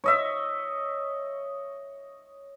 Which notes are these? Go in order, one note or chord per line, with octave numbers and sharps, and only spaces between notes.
C#5 D#5 E5